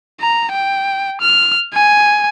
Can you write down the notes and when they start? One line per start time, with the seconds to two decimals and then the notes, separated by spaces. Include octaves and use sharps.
0.20 A#5
0.53 G5
1.21 F6
1.74 G#5